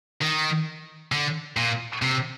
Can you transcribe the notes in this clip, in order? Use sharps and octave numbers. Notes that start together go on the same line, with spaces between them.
D#3
D3
A#2
C3